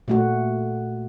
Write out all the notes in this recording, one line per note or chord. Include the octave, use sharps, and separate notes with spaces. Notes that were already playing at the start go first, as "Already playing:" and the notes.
A#2 A3 F#4